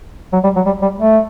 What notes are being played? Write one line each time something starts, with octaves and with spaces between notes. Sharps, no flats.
F#3
G3
F#3
G3
G3
A3